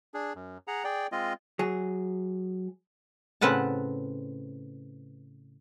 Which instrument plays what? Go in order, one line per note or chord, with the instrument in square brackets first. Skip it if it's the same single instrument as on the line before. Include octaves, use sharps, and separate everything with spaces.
[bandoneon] D4 G#4
F#2
G#4 F#5 A#5
G#4 D5 G5
G#3 C4 F4 D#5
[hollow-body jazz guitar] F#3 G#4
[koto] A2 C#3 C4 B4 F#5 A5